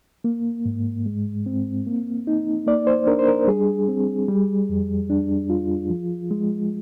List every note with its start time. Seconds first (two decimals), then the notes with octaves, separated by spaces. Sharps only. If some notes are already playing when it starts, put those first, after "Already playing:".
0.24 A#3
0.65 G#2
1.06 G#3
1.46 C4
1.87 A#3
2.27 D#4
2.67 A#3 D5
2.87 C5
3.07 D4 A#4
3.19 C5
3.28 A#4
3.47 G3 G#4
3.89 C4
4.28 G3
4.69 F2
5.10 D4
5.50 F4
5.89 F3
6.31 G#3